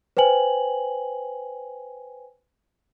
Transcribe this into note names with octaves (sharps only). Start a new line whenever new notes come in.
B4 C5 G5 G#5 F#7